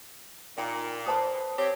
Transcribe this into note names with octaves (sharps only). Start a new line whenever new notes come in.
A#2 D#4 G5 B5
B4 C5 A5 B5 D#6
C4 G4 C#5